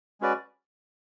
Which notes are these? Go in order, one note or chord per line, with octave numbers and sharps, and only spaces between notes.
G#3 C#4 F#4 B4 D5